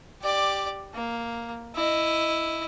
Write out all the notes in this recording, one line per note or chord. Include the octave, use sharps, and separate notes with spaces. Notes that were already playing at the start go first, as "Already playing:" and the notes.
G4 D5
A#3
E4 D#5